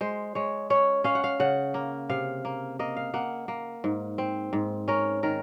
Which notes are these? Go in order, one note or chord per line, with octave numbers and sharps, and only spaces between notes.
G#3 C5
G#3 C#5
C#4 C#5
C#4 F5
F#5
F5
C#3 F#5
A#3
C3 F5
A#3
A#3 D#5
F5
A#3 F#5
A#3
G#2
C4
G#2
C#4 A#4
D#3 A#4